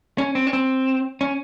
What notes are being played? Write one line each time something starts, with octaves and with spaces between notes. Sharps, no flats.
C#4
C4
C#4
C4
C#4